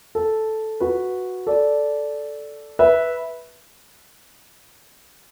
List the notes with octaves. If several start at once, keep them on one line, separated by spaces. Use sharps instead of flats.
A4
F#4 B4
A4 D5
B4 E5